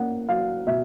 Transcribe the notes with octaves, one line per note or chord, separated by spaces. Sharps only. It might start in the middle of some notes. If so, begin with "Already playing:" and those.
Already playing: A#3 C#4 F#5
F#3 F5
B2 E5